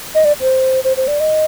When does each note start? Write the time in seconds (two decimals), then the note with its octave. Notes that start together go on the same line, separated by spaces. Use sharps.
0.15 D#5
0.25 D5
0.41 C5
0.84 C5
0.97 C5
1.08 D5
1.20 D#5